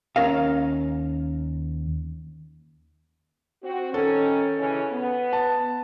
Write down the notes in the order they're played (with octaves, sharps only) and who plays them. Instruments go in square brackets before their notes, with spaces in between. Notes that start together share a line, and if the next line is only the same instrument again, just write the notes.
[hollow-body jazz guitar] D#2 C#4 A#4 D#5 F5
[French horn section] C4 F#4
[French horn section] D#3 C#4 [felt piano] A4
[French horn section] C#3 E3 C#4
B3
[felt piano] A5